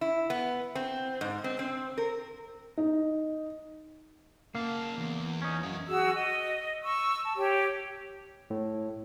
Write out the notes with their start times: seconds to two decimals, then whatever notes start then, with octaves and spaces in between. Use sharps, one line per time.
0.01 E4
0.30 B3
0.75 C4
1.21 G#2
1.44 C4
1.59 C4
1.98 A#4
2.77 D#4
4.55 C#3 A#3 F5 A5
4.98 E2
5.42 C#4 D#4
5.63 F#2 B4 F5
5.87 F#4 G#4 E6
6.13 D#5
6.83 C#6 E6
7.23 A5
7.37 G4 C#5 G5
8.50 A2